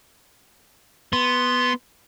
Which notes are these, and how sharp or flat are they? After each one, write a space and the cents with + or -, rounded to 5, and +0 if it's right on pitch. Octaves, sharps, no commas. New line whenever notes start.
B3 +0 C6 +0